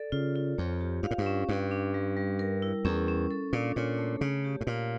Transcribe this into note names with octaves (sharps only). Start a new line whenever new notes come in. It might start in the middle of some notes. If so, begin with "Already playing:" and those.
Already playing: A4 D5
C#3 F4
F4
F2 C#5
G4
G2 F5
A2
G2
C#4
G2 G4
D4
G3
G3
A#4
E4
E2 C#4
C#4
A4
A#2 D4
A#2 C#5
A3
C#3 C#5
G4
A2
A#2 F5